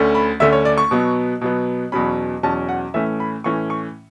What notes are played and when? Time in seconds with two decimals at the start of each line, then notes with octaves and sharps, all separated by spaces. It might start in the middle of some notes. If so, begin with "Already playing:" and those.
Already playing: D2 D3 A3 C#4
0.15 B5
0.40 D2 D3 A3 C#4 E5
0.53 C#5
0.65 D5
0.78 C#6
0.91 B2 F#3 B3
1.41 B2 F#3 B3
1.92 E2 B2 F#3 C#4 B5
2.43 E2 B2 F#3 C#4 A5
2.69 F#5
2.94 A2 E3 A3 C#4 E5
3.20 B5
3.44 A2 E3 A3 C#4 C#6
3.70 C#6